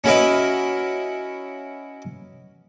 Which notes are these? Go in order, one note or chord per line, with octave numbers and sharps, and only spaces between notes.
C#4 E4 F#4 A#4 B4 D#5